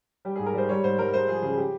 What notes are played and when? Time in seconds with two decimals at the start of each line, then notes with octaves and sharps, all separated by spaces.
0.25 G3 G4
0.36 G#4
0.39 G#2
0.46 A#4
0.54 G3 C5
0.69 G3 C#5
0.83 G#2 C5
0.98 G3 A#4
1.13 G#3 C5
1.28 F3 G#4
1.42 C#3 G#4
1.57 G4